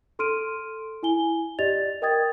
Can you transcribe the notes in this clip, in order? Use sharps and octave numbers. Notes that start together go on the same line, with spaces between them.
A4 C6 F6 D7 D#7
E4 G#5 G7
G4 D5 D#5 A6 F7
A#4 D#5 G5 D#6 G#6 A6